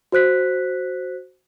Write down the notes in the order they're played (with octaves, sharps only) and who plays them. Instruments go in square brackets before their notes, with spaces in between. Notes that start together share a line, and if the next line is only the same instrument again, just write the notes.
[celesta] F#4 C5 F#6 B6